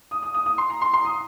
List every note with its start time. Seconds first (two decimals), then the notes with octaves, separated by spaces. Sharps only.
0.11 D#6
0.23 D#6
0.34 D#6
0.46 D#6
0.58 C6
0.70 A#5
0.81 C6
0.93 C6
1.05 D#6